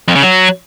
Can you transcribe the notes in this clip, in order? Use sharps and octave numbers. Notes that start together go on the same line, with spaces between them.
F2
C#3
F#3